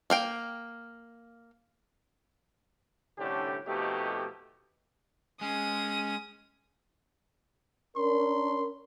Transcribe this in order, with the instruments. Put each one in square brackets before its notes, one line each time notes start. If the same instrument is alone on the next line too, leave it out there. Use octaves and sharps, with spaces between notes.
[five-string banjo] A#3 F5 G5
[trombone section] C2 A2 D3 C#4 D4 G4
F2 B2 A3 D#4 G4
[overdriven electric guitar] G#3 [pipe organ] C#4 [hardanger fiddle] D#6
[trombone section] C#4 D4 A#4 [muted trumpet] C6